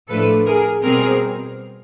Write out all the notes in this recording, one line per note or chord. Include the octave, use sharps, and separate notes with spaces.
A2 F3 A3 D4 A4 B4
G#4 A#4
B2 G3 C4 G#4 A#4